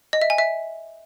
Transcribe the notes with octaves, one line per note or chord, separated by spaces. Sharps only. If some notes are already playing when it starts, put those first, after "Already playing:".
D#5
E5
G#5
E5